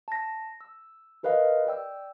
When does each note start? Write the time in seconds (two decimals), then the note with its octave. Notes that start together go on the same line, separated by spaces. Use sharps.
0.08 A5 A#6
0.61 E6
1.23 G4 A#4 B4 D#5 F5
1.67 D5 G5 E6